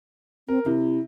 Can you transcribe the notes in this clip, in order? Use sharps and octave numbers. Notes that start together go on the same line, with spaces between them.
C4 A#4
C3 E4